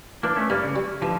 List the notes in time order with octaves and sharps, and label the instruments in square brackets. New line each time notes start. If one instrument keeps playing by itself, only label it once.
[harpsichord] E3 [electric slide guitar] A#3 D4
[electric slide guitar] A3 C#4
[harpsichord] G2 [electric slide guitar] G3 A#3
[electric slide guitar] C#3
[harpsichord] G3
[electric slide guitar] D3 F3 [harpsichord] E3